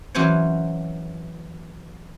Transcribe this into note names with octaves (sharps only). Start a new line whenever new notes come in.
E3 F#3 C#4 C5 C#5